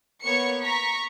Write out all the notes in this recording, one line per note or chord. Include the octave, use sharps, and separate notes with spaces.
A#3 B3 C#5 C#6 C#7
A#5 C#6 B6